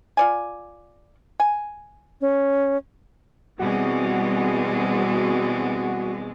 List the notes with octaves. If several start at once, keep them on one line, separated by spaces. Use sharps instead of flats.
F4 D5 G#5
G#5
C#4
B2 E3 G3 G#3 C4 F#4 G#4